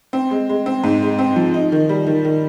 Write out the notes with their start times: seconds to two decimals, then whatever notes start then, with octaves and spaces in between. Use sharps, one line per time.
0.13 C4
0.31 G#3
0.49 G#3
0.66 C4
0.84 G#2
1.02 G#3
1.19 C4
1.36 F3
1.54 D#4
1.72 D#3
1.89 G3
2.07 D#3
2.25 D#3